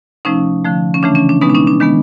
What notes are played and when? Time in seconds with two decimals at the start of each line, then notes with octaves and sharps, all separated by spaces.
0.25 C3 F3 A3 C#4 D#4
0.64 D3 F3 A3
0.94 C#4
1.03 C#3 E3 A3 D4
1.15 C#4
1.29 D4
1.41 B2 G#3 B3 C#4 D#4
1.50 D4
1.55 C#4 D#4
1.67 D4
1.80 D#3 G#3 B3 D4